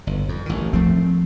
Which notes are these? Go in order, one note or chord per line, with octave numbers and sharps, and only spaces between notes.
G1
F2
A1 D#3
F3 A3 C4